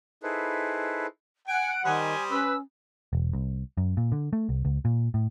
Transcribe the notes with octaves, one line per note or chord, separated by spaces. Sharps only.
D#4 E4 G#4 A4 B4 C5
F#5 G#5 D7
D#3 G3 C5 G#5 D#6
C#4 B4 E6
E1
C2
F#2
A#2
D3
A3
C2
C#2
A#2
A2